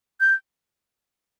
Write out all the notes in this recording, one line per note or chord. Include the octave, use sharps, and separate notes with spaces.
G6